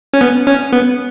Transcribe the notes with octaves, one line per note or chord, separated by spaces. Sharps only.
C#4
B3
C#4
B3